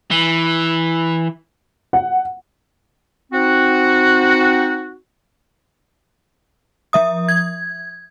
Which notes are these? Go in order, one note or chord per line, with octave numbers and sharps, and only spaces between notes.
E3
F#5
C4 D#4 F#4
F3 E5 D#6
G#6